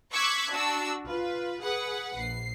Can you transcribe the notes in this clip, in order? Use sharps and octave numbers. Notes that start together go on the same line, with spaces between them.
C#6 D6 E6 F#6 G#6 B6
D4 F#4 E6
F4 B4
G#4 B4 F#5
A#1 C7